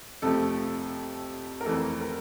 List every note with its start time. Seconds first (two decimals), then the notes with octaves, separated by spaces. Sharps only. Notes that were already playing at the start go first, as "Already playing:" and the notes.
0.22 F2 C3 F3 A3 A4
1.61 A#4
1.65 F2 E3 A3 A4
2.01 A#4